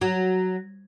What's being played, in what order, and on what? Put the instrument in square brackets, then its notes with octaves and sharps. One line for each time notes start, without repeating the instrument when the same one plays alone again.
[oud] F#3